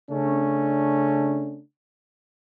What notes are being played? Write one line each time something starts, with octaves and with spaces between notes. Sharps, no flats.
C#3 A3 C#4 D4